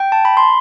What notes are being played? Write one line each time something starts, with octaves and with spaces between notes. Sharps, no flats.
G5
A5
B5
C6